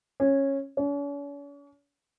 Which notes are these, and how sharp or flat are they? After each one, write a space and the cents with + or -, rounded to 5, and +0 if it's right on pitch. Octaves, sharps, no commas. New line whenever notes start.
C#4 -15
C#4 +45